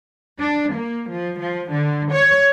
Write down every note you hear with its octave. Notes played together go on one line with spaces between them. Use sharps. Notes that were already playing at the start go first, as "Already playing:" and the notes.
D4
A#3
F3
F3
D3
C#5